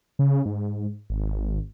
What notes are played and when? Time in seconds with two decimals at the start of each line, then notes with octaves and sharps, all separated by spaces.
0.19 C#3
0.46 G#2
1.10 G#1